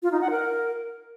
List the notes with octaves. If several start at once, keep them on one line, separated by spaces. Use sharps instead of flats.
F4
D#4
F#5
A#4